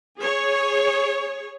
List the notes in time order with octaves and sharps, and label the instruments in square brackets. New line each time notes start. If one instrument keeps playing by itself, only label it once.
[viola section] G#4 C#5